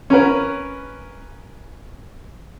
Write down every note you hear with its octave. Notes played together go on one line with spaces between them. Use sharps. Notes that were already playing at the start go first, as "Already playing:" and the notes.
C#4 A#4 B4